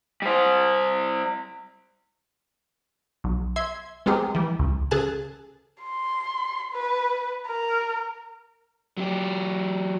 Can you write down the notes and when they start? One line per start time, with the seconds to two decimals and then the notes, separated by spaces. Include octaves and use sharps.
0.22 G3 C5
3.24 B1
3.56 E5 C6 G#6
4.06 G#3 B3 C4 G4 G#4 A#4
4.35 E3 G3
4.59 C#2
4.91 C#3 G#4 A4 G#5 A5 F#6
5.82 C6
6.72 B4
7.48 A#4
8.97 F#3 G4